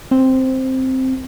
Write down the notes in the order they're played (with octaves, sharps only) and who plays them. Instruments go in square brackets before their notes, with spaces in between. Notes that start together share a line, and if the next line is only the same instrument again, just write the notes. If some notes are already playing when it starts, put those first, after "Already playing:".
[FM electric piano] C4